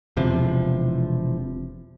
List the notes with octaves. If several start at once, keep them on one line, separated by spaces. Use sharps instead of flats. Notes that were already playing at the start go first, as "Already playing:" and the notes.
E1 E2 C3 F3